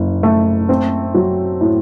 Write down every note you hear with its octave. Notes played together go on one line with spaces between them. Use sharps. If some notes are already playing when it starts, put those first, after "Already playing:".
Already playing: F#1
A3
C4
F#3
A2